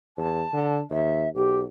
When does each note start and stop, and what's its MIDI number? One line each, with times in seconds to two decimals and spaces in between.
0.17 0.43 40
0.17 0.78 81
0.53 0.80 50
0.90 1.27 39
0.90 1.29 76
1.35 1.65 35
1.35 1.58 67